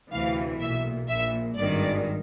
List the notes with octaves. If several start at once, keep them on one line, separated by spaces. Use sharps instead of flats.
D2 C3 E3 F5
B1 A#2 E5
A#1 A#2 E5
G#1 G2 D#3 D5